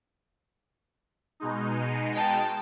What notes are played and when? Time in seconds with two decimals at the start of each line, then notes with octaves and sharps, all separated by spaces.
1.40 B2 G#3 D#4
2.15 G5 A5